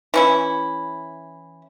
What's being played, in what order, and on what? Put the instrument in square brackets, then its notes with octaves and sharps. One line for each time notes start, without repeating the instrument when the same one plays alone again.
[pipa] E3 C#4 E4